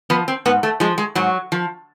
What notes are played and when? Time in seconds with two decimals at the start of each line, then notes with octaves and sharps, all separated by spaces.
0.10 F3 B3
0.28 C4
0.45 G#2 B3
0.63 A3
0.80 F3 G#3
0.98 G#3
1.15 G#2 F#3
1.52 F3